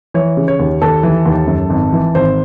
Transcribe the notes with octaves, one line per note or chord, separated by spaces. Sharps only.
E3 C#5
C#3
C#5
D#2
D#2 A4
E3
D#2
F#2
G#1
E3
G#1 C5